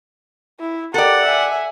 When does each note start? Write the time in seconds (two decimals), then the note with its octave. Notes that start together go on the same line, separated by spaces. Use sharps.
0.60 E4
0.94 G4 A4 A#4 D5 F#5
1.24 E5 G#5